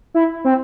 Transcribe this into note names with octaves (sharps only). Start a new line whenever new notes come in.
E4
C4